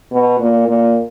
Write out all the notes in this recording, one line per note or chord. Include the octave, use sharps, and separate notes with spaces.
B2
A#2
A#2